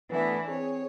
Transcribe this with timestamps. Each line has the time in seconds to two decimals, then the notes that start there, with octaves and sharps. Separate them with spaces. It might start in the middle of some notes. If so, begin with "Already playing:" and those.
0.10 E3 A3 B3 D4 E4
0.48 C4 G#4 C#5